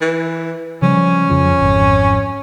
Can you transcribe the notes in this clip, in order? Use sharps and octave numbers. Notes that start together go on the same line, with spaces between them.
E3
C#3 F3 G3 C#4
F2 C#3 F3
G#1 F2